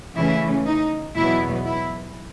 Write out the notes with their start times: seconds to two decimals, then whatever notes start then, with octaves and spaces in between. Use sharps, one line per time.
0.17 C#3 E3 A3 C#4 E4
0.67 D#4
1.16 E2 B2 F#3 B3 E4
1.66 E4